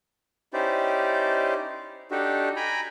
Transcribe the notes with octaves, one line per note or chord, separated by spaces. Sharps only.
C#4 D#4 E4 G4 C5 D5
D4 D#4 F#4 G4 A4
G5 G#5 A#5 B5